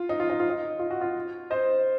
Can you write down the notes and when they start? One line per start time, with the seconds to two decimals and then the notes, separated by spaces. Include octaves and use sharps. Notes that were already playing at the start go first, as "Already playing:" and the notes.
Already playing: F4
0.09 D#4
0.20 F4
0.30 D#4
0.40 F4
0.49 D#4
0.79 F4
0.91 F#4
1.01 F4
1.50 C5 D#5